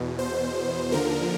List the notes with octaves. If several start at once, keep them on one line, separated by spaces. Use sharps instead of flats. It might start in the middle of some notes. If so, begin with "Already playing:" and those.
Already playing: E2 B2
C5
D#2 D3 F3 A#4